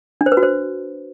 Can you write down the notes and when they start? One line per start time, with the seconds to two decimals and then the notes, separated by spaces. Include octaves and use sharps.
0.21 D4
0.26 C5
0.32 B4
0.37 F#4
0.43 C5